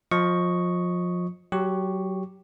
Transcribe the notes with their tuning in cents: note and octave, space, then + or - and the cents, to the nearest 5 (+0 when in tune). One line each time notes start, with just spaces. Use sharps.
F3 +25 D#5 +0 C#6 +0
F#3 +20 G4 +0 C#6 +0